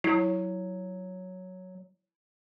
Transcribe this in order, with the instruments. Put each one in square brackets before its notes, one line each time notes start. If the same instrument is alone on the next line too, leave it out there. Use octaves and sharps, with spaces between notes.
[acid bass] F#3 [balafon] E4